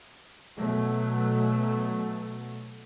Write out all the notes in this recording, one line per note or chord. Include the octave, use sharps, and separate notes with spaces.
B2 F#3 A3